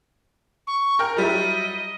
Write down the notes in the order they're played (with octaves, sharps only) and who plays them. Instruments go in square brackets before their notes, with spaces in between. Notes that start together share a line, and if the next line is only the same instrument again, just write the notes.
[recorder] C#6
[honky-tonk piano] A#4 G5 F6
[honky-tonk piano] F#3 G3 E4 [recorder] D#5